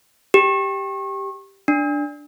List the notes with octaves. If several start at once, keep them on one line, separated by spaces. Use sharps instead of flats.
G4
D4